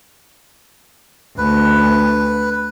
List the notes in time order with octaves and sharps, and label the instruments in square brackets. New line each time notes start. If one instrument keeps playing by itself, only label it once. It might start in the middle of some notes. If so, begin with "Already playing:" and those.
[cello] D2 [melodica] B4